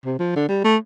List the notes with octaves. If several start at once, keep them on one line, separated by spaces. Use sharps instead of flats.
C3
F3
D3
G3
A3